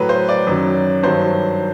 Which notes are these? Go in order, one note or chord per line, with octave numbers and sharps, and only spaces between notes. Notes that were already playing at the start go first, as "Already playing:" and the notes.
Already playing: A2 F#3 B4
C5
D5
F#2 D#3 F#3
G2 D#3 F#3 C5